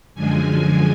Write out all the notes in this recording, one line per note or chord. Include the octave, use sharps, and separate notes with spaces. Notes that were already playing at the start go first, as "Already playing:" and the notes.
F#2 D3 F3 G#3 G#5